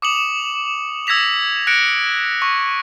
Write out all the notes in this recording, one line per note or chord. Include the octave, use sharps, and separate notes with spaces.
D6 D#6 C#7 E7 F#7
E6 G#6 A#6 B6 F7
F#6 A#6 C#7 D7
C#6